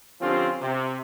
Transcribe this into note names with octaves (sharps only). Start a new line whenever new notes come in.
D3 F3 C4 C#4 F4 G4
C3